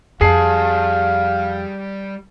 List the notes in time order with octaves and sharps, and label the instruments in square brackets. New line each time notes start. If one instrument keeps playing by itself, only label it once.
[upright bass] F2 [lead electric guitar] G3 A5 [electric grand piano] G#4 C7 [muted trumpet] F5